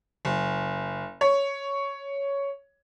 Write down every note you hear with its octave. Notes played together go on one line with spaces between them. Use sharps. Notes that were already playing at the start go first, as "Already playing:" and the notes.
F#1
C#5